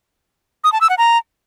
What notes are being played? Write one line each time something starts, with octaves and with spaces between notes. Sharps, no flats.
D#6
A5
E6
F#5
A#5